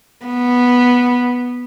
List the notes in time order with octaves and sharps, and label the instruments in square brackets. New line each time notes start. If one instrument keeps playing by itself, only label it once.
[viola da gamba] B3